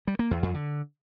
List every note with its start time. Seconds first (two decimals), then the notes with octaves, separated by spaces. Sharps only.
0.07 G3
0.19 A#3
0.31 E2
0.43 F2
0.54 D3